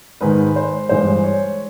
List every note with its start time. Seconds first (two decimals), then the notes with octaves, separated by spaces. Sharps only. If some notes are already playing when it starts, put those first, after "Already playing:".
0.21 G#2 D#3 G#3 B4
0.56 C5
0.89 G2 E3 G#3 C5
1.24 C#5